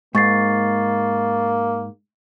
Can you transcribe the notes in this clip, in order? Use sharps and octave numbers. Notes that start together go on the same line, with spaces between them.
G#2 A#3 C#6 A6 C7